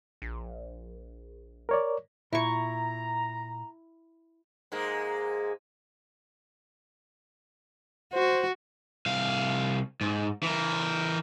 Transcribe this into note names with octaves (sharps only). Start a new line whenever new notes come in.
A#1
A#4 C#5 D5
A#2 E4 A#5 C#6
G#2 G#3 A#3
F#4 C5
C2 F5
G#2
E3 A#4